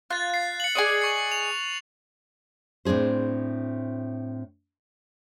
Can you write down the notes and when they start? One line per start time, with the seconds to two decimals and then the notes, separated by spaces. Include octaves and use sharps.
0.10 F4 F#6 A6
0.30 A6 C7
0.60 C#7 F#7
0.75 G#4 D5 D#5
1.02 C#6 C#7
1.31 F7
2.85 A2 C4 D4 G#4 C5